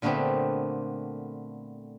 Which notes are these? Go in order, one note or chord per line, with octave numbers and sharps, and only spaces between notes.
A#2 D3 A3 B3 C4 G4